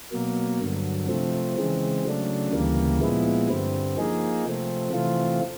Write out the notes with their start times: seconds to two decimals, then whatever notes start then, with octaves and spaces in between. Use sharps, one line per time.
0.12 B2 F#3 A#3
0.60 G2 D3 F#3
1.08 C3 F3 A3 C4
1.57 C#3 E3 G#3 C4
2.04 C#3 F#3 A3 D4
2.52 D2 C#3 E3 G3 A#3
3.00 A#2 F3 G#3 B3 E4
3.49 G2 D3 G3 C4
3.97 F3 A#3 D#4 G#4
4.45 C3 F3 A3 C4
4.93 C3 E3 A3 C4 F4